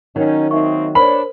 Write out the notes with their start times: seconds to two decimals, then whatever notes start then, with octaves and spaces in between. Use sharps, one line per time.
0.16 D#3 F#3 C#4 D#4
0.51 A#3 C4 D#4 D#5 E5 C#6
0.95 D4 A#4 C5 C#5 B5